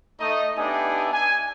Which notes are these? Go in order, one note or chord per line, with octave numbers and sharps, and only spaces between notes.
A3 D#4 D#5
B3 D4 D#4 G4 E5 G#5
G#5